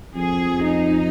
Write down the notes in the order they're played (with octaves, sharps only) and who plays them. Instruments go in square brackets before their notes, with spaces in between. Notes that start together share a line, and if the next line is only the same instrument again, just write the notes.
[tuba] F2 [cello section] G#4
[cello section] D#4